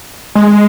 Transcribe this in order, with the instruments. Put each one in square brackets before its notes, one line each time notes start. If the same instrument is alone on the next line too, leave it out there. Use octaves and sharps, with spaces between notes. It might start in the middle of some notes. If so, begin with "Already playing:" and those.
[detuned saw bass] G#3